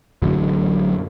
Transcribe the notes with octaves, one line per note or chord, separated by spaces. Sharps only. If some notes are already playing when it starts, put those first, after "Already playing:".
A1 F#2 D3 F#3